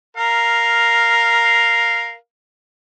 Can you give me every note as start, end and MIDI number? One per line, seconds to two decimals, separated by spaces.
0.17 2.15 70
0.17 2.15 77